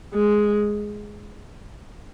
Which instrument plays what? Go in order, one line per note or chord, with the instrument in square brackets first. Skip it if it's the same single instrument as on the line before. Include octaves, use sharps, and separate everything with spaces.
[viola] G#3